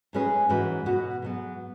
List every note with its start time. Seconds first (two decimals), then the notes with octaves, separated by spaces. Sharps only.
0.13 G#2 G#3 C#4 G#4 B4
0.49 G#2 E3 C#4 F#4 B4
0.86 B2 B3 F#4 B4
1.22 G#2 F#3 B3